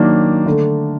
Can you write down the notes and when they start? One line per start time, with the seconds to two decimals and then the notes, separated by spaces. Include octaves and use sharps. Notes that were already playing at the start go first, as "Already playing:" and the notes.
Already playing: D#3 F#3 A#3 D4
0.46 D3 A3 D4